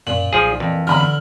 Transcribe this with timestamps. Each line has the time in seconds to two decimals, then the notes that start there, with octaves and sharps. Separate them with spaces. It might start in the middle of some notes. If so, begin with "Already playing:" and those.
0.07 F#2 A#2 F#7
0.33 B1 F3 G#4
0.60 F2 E3
0.87 D3 A#5 B5 F6
1.00 F#7